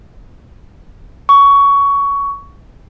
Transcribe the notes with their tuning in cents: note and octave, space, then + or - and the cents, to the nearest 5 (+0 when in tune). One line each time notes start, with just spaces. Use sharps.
C#6 +15